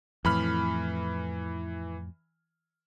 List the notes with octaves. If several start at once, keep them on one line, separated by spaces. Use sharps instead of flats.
F2 A2 E3 B5 F6